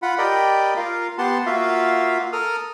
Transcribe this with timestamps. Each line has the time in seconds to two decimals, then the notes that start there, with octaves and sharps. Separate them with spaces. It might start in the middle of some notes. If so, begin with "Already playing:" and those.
0.02 F4 F#5 B5
0.18 G4 A#4 D5 D#5 G5 B5
0.77 F4 A#4 F5
1.18 B3 G4 F#5 A5 C6
1.46 A#3 F4 F#4 E5 F5
2.33 A4 A#4 D#6 F6